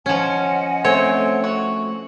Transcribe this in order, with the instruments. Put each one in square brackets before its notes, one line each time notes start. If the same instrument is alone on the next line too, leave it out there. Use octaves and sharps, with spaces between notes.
[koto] F3 C#4 [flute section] D#5 F#5 G#5
[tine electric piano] A3 [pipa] C4 [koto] C#5
[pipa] F#4